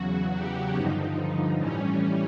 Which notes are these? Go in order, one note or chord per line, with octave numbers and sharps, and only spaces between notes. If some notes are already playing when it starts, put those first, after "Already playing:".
Already playing: E2 C#3 F#3 F#4
G4
G2 D3 F3 D#4
A2 E3 G3 C#4